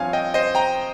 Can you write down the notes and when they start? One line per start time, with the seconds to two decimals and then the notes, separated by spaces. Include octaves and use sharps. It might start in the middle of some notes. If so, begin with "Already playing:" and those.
Already playing: G2 F3 C4 C#5 F5 G#5
0.13 D#5 G5
0.34 C5 D#5
0.55 G5 A#5